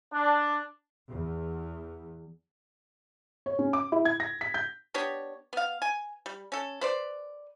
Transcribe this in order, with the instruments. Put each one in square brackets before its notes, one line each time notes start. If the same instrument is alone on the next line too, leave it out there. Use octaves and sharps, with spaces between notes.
[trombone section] D4
[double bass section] E2
[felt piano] C#5
C#4
D6
E4
G#6
A#6
B6
G6
[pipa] B3 D4 G4 C#5
B3 F5
G#5
G3
C#4 A4
B4 C5 D5